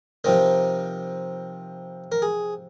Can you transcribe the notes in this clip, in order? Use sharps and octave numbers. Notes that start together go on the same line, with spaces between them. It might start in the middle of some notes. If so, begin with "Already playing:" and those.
C3 F3 C4 D#4 A#4
A#4
G#4